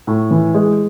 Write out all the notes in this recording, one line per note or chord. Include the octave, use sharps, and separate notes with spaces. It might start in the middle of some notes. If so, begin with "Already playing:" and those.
A2
E3
G#3